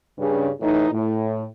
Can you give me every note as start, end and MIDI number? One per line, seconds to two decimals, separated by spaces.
0.18 0.48 43
0.18 0.48 49
0.60 0.88 45
0.60 0.88 52
0.60 0.88 63
0.91 1.43 45